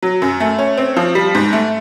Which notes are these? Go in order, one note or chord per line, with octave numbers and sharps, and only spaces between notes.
F#3
F#2
A3
C#4
C4
F3
G3
G#2
A3